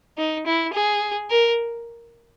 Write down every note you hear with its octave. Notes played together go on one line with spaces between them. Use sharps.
D#4
E4
G#4
A#4